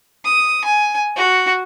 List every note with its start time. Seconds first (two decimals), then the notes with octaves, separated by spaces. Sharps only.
0.25 D#6
0.64 G#5
1.16 F#4